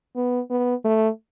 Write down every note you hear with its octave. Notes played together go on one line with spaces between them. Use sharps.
B3
B3
A3